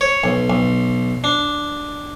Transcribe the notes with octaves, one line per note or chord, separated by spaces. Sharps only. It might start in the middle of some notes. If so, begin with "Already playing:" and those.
C#5
B1
B1
D4